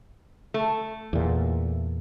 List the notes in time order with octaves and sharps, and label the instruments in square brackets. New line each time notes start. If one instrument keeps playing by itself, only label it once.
[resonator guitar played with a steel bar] A3
[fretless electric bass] E2 A#2